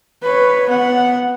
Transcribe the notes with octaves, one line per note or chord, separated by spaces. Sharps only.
B4 C#5
B3 F#5